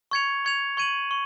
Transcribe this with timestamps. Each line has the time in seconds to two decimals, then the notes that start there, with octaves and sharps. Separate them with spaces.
0.11 C#6 G#6 C#7 F7
0.45 C#6 G#6 C#7 F7
0.77 C#6 G#6 D#7 F#7
1.11 C#6